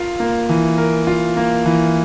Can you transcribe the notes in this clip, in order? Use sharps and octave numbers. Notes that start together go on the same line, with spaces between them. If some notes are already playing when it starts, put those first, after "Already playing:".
Already playing: F4 A#4
A#3
E3
A#4
F4
A#3
E3